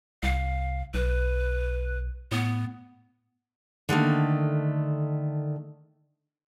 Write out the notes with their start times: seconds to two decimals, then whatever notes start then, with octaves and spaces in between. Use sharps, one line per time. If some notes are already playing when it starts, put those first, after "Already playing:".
0.23 C2 F5
0.94 B1 B4
2.32 A2 B3
3.89 D3 D#3 A3 A#3